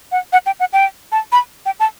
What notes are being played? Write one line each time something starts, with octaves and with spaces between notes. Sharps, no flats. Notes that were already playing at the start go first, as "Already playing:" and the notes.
F#5
F#5
G5
F#5
G5
A5
B5
G5
A5